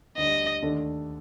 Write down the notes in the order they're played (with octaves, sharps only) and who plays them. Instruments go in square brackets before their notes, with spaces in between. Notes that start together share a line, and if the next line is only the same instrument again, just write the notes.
[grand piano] D2 D3 G3 [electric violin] D#5
[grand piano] D#2 D3 A3 D4 A4